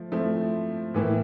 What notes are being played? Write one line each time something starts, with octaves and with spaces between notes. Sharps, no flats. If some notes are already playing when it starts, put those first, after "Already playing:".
Already playing: F3 A3
F3 A3 C4 E4
A2 E3 A#3 E4